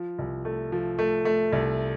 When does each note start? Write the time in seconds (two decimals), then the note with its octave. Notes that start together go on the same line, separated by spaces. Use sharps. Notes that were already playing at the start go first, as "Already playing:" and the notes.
Already playing: F3
0.19 C2
0.45 A3
0.72 F3
0.99 A3
1.25 A3
1.53 C2